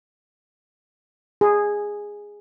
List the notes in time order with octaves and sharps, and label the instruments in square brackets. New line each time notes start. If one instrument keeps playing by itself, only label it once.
[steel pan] G#4